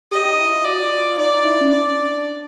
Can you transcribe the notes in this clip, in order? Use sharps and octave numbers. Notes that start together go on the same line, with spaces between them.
G4 D#5
D#4
E4
F4
F#4 D5
F4
F4
D#4 D5
E4
C#4
D4 D5